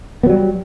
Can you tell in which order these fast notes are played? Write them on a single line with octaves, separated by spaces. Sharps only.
B3 F#3 G3